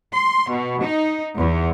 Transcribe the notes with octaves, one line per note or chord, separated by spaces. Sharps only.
C6
B2
D#4
E2